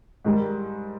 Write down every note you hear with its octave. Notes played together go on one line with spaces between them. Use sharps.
G#2 D#3 G3